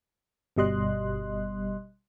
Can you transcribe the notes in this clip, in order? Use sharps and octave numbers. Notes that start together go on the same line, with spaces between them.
G1 B2 G3 D#5 C6 F#6